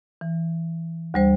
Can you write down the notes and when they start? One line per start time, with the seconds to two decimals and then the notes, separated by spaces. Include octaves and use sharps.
0.21 E3
1.14 D2 G3 C5